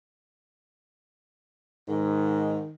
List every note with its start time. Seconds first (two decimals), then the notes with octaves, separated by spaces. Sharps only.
1.88 G#2 D#3